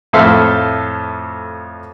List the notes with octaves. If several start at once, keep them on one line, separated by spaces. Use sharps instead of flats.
F2 A2 A4 C5 E5 F5